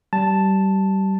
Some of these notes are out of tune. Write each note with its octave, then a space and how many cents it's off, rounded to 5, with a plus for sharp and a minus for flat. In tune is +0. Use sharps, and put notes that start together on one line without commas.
G3 -25 A5 +0